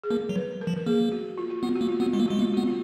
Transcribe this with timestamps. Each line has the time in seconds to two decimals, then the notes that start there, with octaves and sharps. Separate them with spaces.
0.04 G#4
0.11 A#3 A#4
0.29 F#3
0.36 B4
0.61 A#4
0.67 F3
0.77 A#4
0.86 A#3 G#4
1.12 F#4
1.38 F4
1.50 F#4
1.63 B3 F4
1.76 F#4
1.81 A#3
1.89 F4
2.00 B3 F#4
2.13 G#3 F4
2.20 A#3
2.28 G#3 F#4
2.39 A#3
2.41 F4
2.53 B3 F#4
2.67 F4